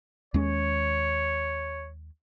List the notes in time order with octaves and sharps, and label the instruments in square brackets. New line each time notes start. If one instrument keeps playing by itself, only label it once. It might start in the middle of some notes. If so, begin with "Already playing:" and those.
[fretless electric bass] D#2 G#3 C#4 [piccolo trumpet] C#5